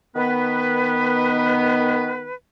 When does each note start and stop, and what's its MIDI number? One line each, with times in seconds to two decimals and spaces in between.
0.16 2.34 51
0.16 2.34 59
0.16 2.34 71